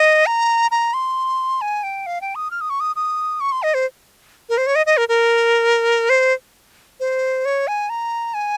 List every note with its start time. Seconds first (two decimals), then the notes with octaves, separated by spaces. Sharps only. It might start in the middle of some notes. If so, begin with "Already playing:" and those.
Already playing: D#5
0.26 A#5
0.71 A#5
0.94 C6
1.61 G#5
1.83 G5
2.06 F5
2.21 G5
2.35 D#6
2.51 F6
2.61 D#6
2.70 C#6
2.80 D#6
2.96 D#6
3.41 C#6
3.52 C6
3.63 D#5
3.74 C5
4.49 A#4
4.58 C5
4.67 C#5
4.75 D#5
4.86 D#5
4.97 A#4
5.09 A#4
6.10 C5
7.00 C5
7.45 C#5
7.68 G#5
7.90 A#5
8.34 G#5